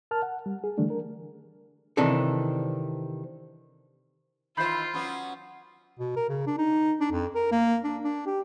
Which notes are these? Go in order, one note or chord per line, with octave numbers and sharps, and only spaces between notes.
A#4 A5 F6
F#5
G3
G#4
D3 E3 G3 A3 D4
A#4
C3 D#3 E3 C4 D4 A4
D#3 E3 F4 C5 B5 G6 C7
F#3 B3 C#4
B2
A#4
C#3
D4
D#4
D4
F2
A#4
A#3
D4
D4
G4